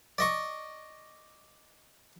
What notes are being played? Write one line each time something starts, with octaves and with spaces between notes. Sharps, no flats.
D5 D#5 C#6